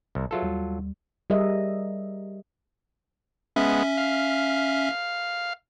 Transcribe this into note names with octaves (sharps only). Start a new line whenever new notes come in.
C2
F#3 F4 G#4 A4 B4 E5
D#2 G3
G3 G#4 A#4 D#5 E5
G#3 B3 C#4 E5
F5